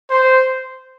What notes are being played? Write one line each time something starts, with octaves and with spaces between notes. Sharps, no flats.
C5